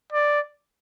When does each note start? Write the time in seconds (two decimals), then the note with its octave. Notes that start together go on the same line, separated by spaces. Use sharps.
0.13 D5